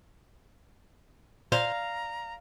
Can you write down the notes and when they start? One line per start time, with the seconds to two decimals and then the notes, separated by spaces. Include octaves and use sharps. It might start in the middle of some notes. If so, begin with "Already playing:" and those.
1.52 A#2 C5 D5 F5 A#5 C6